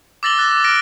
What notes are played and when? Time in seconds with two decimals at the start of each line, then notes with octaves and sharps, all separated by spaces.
0.23 D6 E6 A6 A#6 F#7 G7
0.39 F#6
0.64 F6 A#6 D7